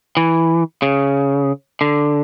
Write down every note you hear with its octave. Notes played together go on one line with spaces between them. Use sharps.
E3
C#3
D3